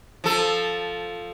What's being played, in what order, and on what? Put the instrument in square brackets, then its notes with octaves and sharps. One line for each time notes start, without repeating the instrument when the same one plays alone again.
[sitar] F3 A4